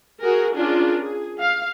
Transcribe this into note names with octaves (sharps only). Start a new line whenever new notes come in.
F#4 G#4 A#4
C#4 D4 F4 G#4 A#4
G#4
F5